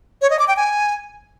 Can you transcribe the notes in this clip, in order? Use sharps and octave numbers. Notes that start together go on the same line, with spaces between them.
C#5
D#5
D6
G5
G#5